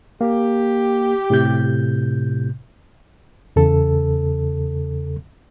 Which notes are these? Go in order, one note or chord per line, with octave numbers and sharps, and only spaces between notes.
A#3 G4
A2 C3 G6
E2 C#3 A4